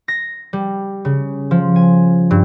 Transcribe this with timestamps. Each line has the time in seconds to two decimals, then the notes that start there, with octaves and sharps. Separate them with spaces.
0.08 A#6
0.53 G3
1.05 C#3
1.51 F3
1.76 G#5
2.31 G2